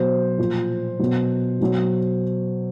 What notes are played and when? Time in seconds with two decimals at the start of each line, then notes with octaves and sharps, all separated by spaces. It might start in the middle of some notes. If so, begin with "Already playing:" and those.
Already playing: B2 F#3 C5
0.38 A#2 F3
0.99 B2 F#3
1.61 B2 F#3